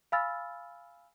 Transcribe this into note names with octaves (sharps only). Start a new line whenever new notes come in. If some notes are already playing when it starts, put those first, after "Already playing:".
F5 G#5 B5 E6 F6 A6